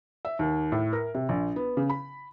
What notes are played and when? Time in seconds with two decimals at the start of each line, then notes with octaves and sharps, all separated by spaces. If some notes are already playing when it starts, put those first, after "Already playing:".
0.25 E5
0.39 D#2
0.72 A2
0.93 A#4
1.14 C3
1.29 A#1
1.56 B3
1.77 C#3
1.90 B5